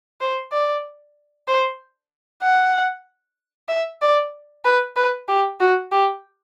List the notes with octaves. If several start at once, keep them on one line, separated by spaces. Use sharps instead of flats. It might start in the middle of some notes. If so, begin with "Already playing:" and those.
C5
D5
C5
F#5
E5
D5
B4
B4
G4
F#4
G4